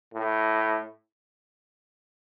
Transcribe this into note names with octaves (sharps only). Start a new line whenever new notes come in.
A2